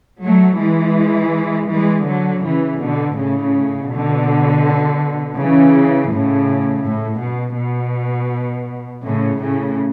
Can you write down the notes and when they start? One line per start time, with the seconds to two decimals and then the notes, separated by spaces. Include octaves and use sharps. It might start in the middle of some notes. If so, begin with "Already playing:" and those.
0.24 F#3 A3
0.60 E3 G#3
1.70 E3 G#3
2.07 D3 F#3
2.44 C#3 E3
2.81 B2 D3
3.17 A2 C#3
3.91 B2 D3
5.38 C#3 E3
6.12 A2 C#3
6.85 A2
7.22 B2
7.58 B2
9.05 A2 C#3
9.42 A2 C#3